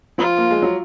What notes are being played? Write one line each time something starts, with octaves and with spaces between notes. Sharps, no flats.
F3 F4
A#3
G#3
F#3